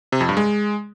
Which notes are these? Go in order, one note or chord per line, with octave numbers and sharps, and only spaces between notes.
C3
F2
G2
G#3